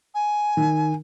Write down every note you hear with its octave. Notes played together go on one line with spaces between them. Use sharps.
G#5
D#3